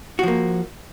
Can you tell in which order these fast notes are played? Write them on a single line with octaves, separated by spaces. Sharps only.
F#4 F3 A#3